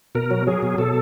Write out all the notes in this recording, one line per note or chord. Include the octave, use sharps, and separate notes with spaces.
B2 A#4
F#3
F#3 G#4
B2
B2 A4